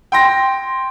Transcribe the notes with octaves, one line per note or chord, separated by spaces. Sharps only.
G5 C6 A#6